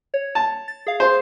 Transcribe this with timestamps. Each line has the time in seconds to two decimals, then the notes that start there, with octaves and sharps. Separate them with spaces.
0.14 C#5
0.35 A5
0.68 A6
0.87 G#4 F5
1.00 C5